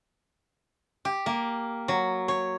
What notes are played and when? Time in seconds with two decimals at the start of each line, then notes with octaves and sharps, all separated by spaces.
1.05 G4
1.26 A#3
1.88 F#3
2.28 C#5